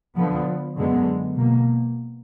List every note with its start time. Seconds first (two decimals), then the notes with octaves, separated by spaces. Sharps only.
0.17 D3 F3 B3
0.76 F#2 D3 G#3 B3
1.35 B2 A#3